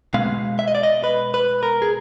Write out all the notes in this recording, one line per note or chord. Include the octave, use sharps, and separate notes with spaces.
B2 G#3 F5
E5
D#5
D5
D#5
B4
B4
A#4
G#4